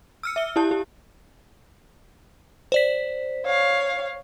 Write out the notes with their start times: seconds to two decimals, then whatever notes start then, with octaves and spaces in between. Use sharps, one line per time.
0.23 E6 F6 C#7
0.36 E5 G7
0.56 E4 G4 A5
0.71 G4
2.72 C5 D5 B6
3.46 C#5 F5